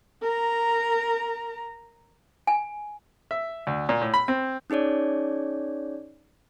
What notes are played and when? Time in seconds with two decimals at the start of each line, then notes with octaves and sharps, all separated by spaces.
0.22 A#4 A#5
2.47 G#5
3.31 E5
3.67 D2
3.89 A#2
4.01 A2
4.14 B5
4.28 C4
4.70 C#4 D#4 G#4 C#5 D5